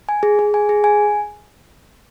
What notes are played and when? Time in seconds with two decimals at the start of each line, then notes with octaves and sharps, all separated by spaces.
0.09 G#5
0.23 G#4
0.39 G#4
0.54 G#5
0.69 G#4
0.84 G#5